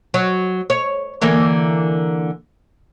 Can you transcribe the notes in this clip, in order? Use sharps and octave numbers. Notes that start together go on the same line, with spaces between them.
F#3
C#5
D3 E3 A#3